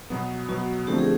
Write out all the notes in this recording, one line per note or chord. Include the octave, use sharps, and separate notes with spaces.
B2 F#3 B3
B2 F#3 B3 F#4
D3 F3 A3 C4 G4
G#4